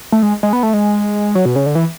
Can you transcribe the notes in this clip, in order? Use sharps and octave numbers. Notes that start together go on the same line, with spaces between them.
A3
G#3
G#3
B3
A3
G#3
F#3
B2
C#3
D3
E3